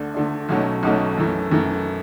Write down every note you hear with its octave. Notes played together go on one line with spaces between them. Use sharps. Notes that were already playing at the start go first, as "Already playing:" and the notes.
Already playing: D2 D3 A3 D4
D2 D3 A3 D4
B1 B2 F#3 A3 C#4
B1 B2 F#3 A3 C#4
F#2 E3 A3
F#2 E3 A3